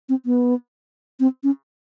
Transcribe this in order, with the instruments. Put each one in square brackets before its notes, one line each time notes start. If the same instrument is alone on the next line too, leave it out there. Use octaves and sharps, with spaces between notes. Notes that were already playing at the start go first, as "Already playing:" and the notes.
[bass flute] C4
B3
C4
C#4